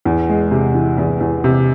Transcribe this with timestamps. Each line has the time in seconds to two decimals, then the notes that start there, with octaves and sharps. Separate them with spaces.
0.05 E2
0.29 G#3
0.51 C3
0.75 E3
0.98 E2
1.21 E2
1.44 C3